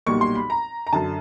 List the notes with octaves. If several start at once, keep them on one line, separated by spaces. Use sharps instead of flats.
B1 A#2 G3 C#6
C6
B5
A#5
A#5
F#2 D3 A5